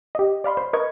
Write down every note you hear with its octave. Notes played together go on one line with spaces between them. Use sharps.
G4 D#5
D5 F5 B5 C6
C5
A#4 B4 D#5 C#6 G#6